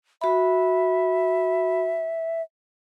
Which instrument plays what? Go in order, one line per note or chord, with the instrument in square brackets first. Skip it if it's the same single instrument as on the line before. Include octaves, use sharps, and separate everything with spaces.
[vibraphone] F#4 B5 [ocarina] E5